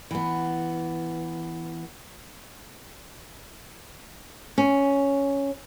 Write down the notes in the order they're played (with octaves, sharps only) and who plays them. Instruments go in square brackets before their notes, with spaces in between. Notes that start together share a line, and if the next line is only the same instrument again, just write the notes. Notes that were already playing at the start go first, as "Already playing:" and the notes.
[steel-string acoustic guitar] E3 B3
[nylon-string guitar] C#4